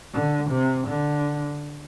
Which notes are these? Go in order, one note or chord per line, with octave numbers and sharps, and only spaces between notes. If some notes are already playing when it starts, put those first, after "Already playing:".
D3
C3
D3